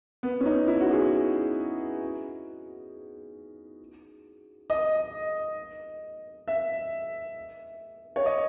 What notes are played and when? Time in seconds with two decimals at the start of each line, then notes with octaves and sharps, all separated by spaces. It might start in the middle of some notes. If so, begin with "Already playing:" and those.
0.23 B3
0.41 C#4
0.46 D#4
0.67 E4
0.80 F#4
0.90 G#4
4.70 D#5
6.48 E5
8.16 C#5
8.26 D#5